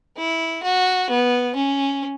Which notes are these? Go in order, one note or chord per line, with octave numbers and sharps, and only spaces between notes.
E4
F#4
B3
C#4